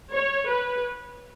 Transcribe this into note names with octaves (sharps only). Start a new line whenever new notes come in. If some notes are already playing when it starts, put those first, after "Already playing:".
C#5
B4